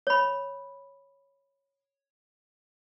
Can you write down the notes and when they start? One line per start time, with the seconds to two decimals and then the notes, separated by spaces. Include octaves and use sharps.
0.07 C#5 B5